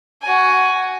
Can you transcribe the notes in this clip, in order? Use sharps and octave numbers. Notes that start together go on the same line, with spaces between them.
F#4 G#5